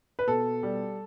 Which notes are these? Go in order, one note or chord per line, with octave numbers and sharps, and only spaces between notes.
B4
B2 A4
G3